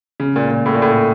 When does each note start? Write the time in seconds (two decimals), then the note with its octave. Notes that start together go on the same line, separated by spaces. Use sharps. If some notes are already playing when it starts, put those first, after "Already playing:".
0.20 C#3
0.36 A#2
0.51 A#2
0.66 A2
0.75 A#2
0.82 A2